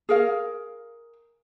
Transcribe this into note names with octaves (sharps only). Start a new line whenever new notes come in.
G#4 A#4 F5